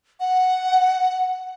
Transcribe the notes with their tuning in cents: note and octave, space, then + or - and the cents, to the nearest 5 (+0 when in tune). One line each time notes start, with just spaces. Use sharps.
F#5 +0